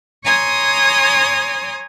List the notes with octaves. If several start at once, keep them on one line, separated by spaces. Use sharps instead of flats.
C#5 G#5 A#5 C6 D#6